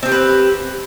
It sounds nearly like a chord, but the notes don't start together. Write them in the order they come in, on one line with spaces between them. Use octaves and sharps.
C4 G#4 G4 B4